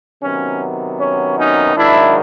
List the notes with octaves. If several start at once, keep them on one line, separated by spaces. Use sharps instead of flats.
C3 D#3 F#3 B3 C#4
C#4
C#4 D#4
G#2 D#3 F#3 D4 E4